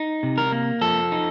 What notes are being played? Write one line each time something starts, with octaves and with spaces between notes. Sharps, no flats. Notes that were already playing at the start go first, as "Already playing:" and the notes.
Already playing: D#4
C3
A#4
A#3
F3 A4
D#4